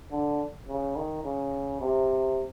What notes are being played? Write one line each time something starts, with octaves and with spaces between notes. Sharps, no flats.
D3
C#3
D#3
C#3
C3